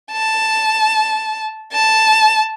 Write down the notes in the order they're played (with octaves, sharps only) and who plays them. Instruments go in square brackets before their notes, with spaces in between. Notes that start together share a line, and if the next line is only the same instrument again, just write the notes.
[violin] A5
A5